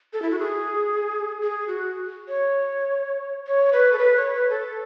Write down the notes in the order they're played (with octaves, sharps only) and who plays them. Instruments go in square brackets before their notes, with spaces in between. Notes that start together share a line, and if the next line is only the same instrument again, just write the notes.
[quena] A4
E4
F#4
G#4
G#4
F#4
C#5
C#5
B4
A4
B4
C#5
B4
A4